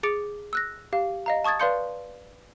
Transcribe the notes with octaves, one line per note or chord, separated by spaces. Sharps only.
G#4 D6 A6 C#7 D7
E6 F#6 A#6
G4 F5
D#5 F5 A#5
A5 C#6 D#6 G#6 A6
B4 D5 F5 C6 G6 C#7